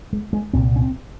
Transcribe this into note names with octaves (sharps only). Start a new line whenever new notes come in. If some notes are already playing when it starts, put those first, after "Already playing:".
G#3
G#3
C2 A#2 C4
C#4
C4